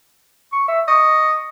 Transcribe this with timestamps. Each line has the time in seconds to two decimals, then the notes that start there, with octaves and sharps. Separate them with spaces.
0.52 C#6
0.68 E5
0.88 D#5 C#6